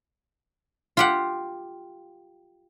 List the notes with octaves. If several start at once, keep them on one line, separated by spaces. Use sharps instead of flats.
F4 G4 F#5